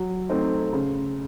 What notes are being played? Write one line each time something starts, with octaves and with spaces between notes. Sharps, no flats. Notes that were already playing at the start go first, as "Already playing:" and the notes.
Already playing: F#3
A3 C4 D#4
C#3